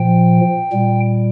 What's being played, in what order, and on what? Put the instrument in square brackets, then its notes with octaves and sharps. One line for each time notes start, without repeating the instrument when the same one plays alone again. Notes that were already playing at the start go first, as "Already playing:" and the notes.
Already playing: [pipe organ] A#2 F3 G5
A#2 G3